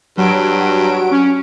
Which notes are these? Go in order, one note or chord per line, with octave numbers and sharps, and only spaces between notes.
G2 F#3 D7
C#4